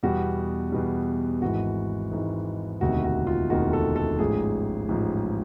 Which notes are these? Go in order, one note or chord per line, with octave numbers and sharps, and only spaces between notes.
E2 B2 G3 F#4
E2 B2 G3
G#1 G#2 E3 F#4
G#1 G#2 E3
E1 D2 C3 D#3 F#4
F#4
F4
E1 D2 C3 D#3 F#4
A4
A4
A1 G#2 F3 G#4
A1 G#2 F3